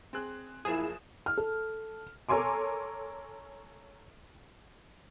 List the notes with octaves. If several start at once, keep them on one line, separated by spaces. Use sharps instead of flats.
C4 G#4 F#6
F#1 F3 A#3 E4 G#4 E7
F6
A4
A4 A#4 C#5 G#5 C6 D6